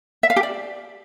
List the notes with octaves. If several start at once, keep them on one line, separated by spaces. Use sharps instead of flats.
E5
F5
G4
D5